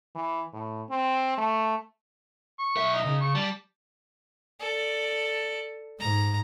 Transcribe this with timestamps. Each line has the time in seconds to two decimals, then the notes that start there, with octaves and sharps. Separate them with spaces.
0.15 E3
0.53 A2
0.90 C4
1.38 A3
2.59 C#6
2.77 B1 E5
2.94 D#4
3.06 C#3
3.21 C#6
3.35 G3 D5 A5
4.60 A4 D5
6.00 G#2 A#5